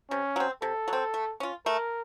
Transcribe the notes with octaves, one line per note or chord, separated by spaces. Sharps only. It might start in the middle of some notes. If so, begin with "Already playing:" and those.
C3 C#4
F#3 C4
C3 A4
F#3
C4
A3
C#4 F4
A3 A#4